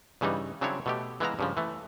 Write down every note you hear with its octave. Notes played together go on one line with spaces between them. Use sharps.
G2 C#3 E3 G3 D#4
C#3 F#3 C4 D4 E4 C#5
B2 A3 G4
E3 G#3 B3 E4 F5 A#5
G2 C#3 F3
E3 A3